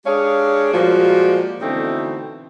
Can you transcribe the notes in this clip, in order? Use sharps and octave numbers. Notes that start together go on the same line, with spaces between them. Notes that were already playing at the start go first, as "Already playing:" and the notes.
G#3 D4 G4 G#4 C#5 F5
A#2 F3 G3 G#3 A#3 F#4
B2 D3 E3 A3 C4 D#4